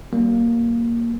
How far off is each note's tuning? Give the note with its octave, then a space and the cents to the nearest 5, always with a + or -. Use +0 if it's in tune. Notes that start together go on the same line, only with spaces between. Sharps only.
G3 -40 A#3 +0